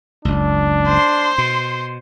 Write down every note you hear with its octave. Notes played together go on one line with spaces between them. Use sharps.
F#1 C#2 D4
C5 C6
B2